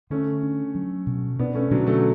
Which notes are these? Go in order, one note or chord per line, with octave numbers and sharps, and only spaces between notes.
D3 A3 C#4
D4
F#3
B2
B2 B3 D4
A3 C#4
B2 D3 F#3
F#3 A3